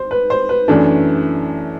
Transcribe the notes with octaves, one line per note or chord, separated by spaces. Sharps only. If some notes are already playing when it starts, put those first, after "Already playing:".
Already playing: C5
B4
C5
B4
F#2 E3 A3 D4